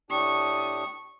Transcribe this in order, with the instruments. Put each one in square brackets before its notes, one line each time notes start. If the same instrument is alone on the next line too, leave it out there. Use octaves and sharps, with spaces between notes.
[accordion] A2 D4 G4 [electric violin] C#6 [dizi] D#6